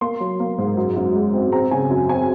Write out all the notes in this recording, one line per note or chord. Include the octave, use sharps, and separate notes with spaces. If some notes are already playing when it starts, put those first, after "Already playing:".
A#3 C6
F#3
A#3
G#2
F#2
F#2
G#3
C4
C4 A#5
C#3 G#5
F#2
C4 G#5